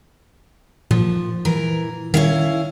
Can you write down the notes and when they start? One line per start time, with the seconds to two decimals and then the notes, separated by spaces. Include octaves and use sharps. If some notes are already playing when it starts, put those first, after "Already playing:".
0.91 A#2 F3
1.45 E3 A#4
2.14 D#3 C#4 E4 F5